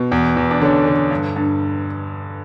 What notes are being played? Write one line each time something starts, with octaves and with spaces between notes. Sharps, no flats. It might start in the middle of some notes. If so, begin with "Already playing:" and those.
Already playing: B2
E2
E2
D4
D3 C#4
D3
G2
G2